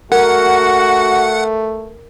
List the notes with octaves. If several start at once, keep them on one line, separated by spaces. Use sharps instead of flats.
A3 F#4 A#4 F#5